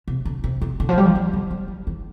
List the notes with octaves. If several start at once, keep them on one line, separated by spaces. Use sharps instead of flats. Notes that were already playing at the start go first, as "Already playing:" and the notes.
C3
D3
C3
C3
D3
F3
G3
F3
G3
D3
G3
F3
D#3